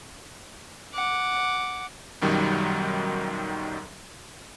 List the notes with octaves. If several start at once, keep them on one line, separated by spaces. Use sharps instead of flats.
F#5 D6
B1 F#2 D#3 F#3 G3